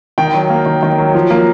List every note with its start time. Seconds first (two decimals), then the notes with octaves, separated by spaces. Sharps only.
0.18 D#3 G5
0.34 F#3
0.50 A#3
0.66 D#3
0.83 D#3
0.98 F#3
1.15 F3
1.31 A#3